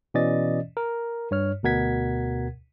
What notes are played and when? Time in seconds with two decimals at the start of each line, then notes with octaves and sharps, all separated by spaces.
0.14 B2 E3 C#4 D5 D#5 A6
0.77 A#4
1.31 G2 C#5 F6
1.63 D2 B2 A#4 F#5 G#6 B6